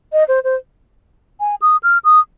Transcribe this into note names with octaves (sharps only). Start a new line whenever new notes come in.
D#5
C5
C5
G#5
D#6
F6
D#6